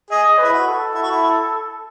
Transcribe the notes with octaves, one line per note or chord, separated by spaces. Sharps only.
G#4 D#5
B4
E4
F#4
A4
E4
F#4
E4